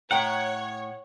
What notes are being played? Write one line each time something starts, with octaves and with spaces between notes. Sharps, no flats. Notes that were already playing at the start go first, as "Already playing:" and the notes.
A2 C#5 F#5 G5 A#5